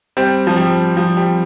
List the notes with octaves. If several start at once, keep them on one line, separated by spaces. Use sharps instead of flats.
G3 C4
F3
G3
F3
G3